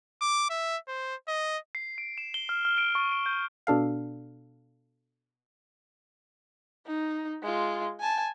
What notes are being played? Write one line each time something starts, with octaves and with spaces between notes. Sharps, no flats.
D6
E5
C5
D#5
C7
D7
E7
G7
F6
F6
D7
C#6
D7
G6
B2 D4 A4 F5
D#4
G#3 F4
G#5 A5